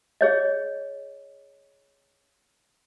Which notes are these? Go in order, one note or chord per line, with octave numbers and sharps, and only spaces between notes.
G#4 C#5 D#5